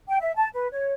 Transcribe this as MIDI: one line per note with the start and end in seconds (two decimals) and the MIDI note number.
0.08 0.17 79
0.21 0.32 76
0.36 0.48 81
0.54 0.67 71
0.72 0.93 73